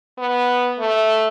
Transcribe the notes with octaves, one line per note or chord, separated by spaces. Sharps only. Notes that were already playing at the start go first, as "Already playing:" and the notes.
B3
A3